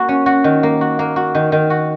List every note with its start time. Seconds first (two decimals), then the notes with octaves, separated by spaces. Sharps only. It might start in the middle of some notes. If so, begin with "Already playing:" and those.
Already playing: A#3 F#4
0.09 C#4
0.26 F#4
0.44 D#3
0.63 A#3
0.81 F#4
0.99 A#3
1.16 F#4
1.35 D#3
1.52 D#3
1.70 F#4